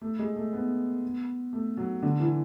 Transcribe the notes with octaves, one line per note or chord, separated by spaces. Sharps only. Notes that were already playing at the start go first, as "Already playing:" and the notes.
A3
G#3
A3
B3
A3
F#3
D3
E3